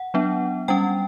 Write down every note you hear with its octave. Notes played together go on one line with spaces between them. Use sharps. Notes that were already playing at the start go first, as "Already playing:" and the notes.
Already playing: F#5
F#3 B3 D4
G3 C#4 G5